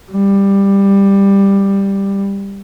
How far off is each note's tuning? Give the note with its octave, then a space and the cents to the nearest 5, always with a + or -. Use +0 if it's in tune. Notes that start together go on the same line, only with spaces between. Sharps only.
G3 +10